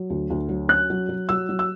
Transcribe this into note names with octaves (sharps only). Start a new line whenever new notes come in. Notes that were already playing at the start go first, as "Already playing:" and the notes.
Already playing: F#3
D2
D2
F#3
C#4 F#6
F#3
F#3
F#3 E6
F#3
E6